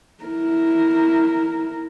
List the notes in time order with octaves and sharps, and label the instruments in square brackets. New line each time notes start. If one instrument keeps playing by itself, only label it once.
[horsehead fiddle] E4 A#4